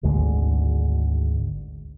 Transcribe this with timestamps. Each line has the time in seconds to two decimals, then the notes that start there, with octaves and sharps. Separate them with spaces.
0.03 G#1 D2 D3 G#3